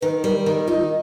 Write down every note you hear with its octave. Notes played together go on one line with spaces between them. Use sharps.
D#3 B4
G3 A#4
D#3 A#4
D#4 F4